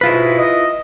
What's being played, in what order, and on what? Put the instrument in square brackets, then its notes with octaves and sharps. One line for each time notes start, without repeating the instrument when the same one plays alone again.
[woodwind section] G#2 B2 G#3 [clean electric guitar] E4 F4 B4
[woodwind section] D#5